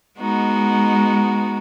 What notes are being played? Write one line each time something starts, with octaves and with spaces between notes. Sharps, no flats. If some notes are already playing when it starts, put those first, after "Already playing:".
G#3 B3 D#4 F#4